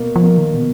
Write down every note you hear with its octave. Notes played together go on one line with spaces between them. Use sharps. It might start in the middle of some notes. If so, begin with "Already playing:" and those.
Already playing: B2 A#3
F3
A#3
D#3
B2